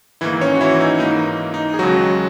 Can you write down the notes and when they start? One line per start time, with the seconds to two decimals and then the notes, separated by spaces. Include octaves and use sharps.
0.21 G#2 D#3 E3 A#3 E4
0.41 C#4 C#5
0.55 F#4
0.61 E3 E4
0.80 D#4
1.00 G#2 E3 A#3 D#4
1.54 D#4
1.74 G#4
1.79 D#2 C#3 F#3 G#3 F#4